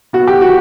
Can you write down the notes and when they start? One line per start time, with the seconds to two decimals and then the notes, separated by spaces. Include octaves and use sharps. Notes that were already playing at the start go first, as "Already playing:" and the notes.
0.13 B3 F#4
0.27 G4
0.41 F#4